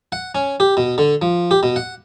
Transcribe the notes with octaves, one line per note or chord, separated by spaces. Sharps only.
F#5
C#4
G4
B2
D3
F3
G4
B2
F#5